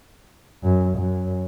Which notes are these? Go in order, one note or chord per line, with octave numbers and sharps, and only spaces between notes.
F#2
F#2